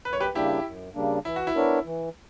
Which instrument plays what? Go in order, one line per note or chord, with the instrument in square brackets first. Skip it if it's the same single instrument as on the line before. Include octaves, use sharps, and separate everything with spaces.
[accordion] F#2 [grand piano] B4
[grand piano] C#5
G4 B4
[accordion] C#3 G3 A#3 D4 [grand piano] E4 G4
[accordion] F#2
C#3 G3 A#3 D4
[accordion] E3 [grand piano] E4
[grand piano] F#4
E4
[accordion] B3 D4 A#4 C#5
E3